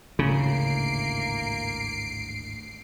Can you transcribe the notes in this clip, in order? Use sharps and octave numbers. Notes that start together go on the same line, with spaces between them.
G#1 D2 A2 C#3 A#3 C7 D7